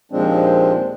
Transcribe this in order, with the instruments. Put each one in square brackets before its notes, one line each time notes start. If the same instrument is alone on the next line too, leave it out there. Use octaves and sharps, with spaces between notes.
[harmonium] D#2 A#2 F3 G#3 C4 D4